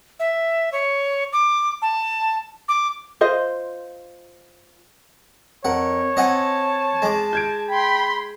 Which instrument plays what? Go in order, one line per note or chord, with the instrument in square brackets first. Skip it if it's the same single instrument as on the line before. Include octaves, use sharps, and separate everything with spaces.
[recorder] E5
C#5
D6
A5
D6
[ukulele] F4 C5 D#5
[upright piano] F2 A#4 [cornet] C#5 [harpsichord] F#5
[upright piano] C4 [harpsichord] D#5 F#5 G#5 [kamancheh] A5
[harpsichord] G#3 D6
[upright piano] G6 G#6 D7
[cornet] G5 [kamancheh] B5 C6